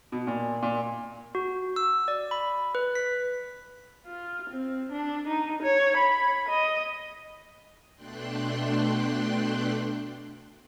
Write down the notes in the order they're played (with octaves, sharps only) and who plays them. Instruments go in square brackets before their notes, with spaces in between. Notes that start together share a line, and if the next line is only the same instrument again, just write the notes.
[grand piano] B2
A#2
A#2
[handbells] F#4
E6
D5
B5
B4
B6
[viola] F4
C4
D4
D#4
C#5
B5
D#5
[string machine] B2 A3 D4 G5 C6 F#6